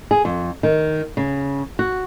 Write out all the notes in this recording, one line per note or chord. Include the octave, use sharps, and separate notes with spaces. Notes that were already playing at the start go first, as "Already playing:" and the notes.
G#4
F2
D#3
C#3
F#4